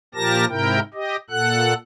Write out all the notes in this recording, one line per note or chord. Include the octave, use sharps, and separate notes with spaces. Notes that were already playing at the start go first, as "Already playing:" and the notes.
A#2 F3 G4 A#4 A5 A#6
G#2 C3 E4 A#4 G5
G4 D#5
A#2 A4 F#5 F#6